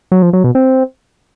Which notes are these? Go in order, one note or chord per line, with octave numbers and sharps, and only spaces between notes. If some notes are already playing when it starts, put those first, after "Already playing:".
F#3
F3
F#3
B2
C4